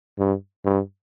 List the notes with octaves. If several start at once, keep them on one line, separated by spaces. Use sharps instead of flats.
G2
G2